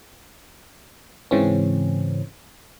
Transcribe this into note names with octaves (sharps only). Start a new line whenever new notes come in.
G#2 C#3 E3 C4 C#4